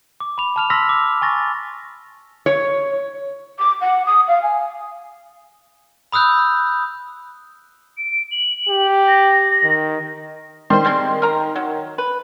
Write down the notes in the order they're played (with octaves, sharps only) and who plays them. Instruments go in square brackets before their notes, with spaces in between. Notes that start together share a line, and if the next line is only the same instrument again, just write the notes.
[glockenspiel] D6
B5 F7
A5 F6 F7
C6 E6 F6 A#6 B6
D6
G#5 C#6 A6 A#6
[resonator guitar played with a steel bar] C#5
[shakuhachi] D6
F#5
D#6
F5
G#5
[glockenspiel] B5 D#6 E6 F#6 G6
[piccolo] D7
F#7
[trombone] G4
[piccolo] A#6
[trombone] D#3
[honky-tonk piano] D#3 C6 [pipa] G3 C5
[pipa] G3 G#3 C4
A#4 A#5
F#3
B4